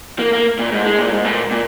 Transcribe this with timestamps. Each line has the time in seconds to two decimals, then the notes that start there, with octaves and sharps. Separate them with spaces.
0.19 A#3
0.33 A#3
0.59 A#2
0.72 G#2
0.85 G#3
0.99 A#2
1.11 G#2
1.25 A#2
1.51 A#2